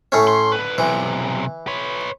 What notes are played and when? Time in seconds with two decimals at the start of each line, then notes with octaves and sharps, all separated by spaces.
0.12 A2 A3 C#4
0.27 C6
0.52 D3 B4
0.78 B1 C3 E3
1.67 B4 C#5